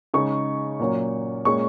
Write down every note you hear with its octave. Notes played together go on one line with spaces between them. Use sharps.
C#3 G#3 D#4 C#6
A#2 F#3 C#4
A#2 G#3 C#4 C#6